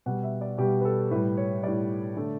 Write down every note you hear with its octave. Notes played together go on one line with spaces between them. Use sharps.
B2 G3 F#5
E5
D5
B2 G3 G4
B4
A4
A2 G3 B4
C#5
A2 G3 D5
D3 A3